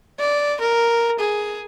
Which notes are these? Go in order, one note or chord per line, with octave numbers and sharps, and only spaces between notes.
D5
A#4
G#4